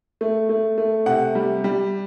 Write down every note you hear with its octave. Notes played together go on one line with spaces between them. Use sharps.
A3
A3
A3
C3 F#5
G3
G3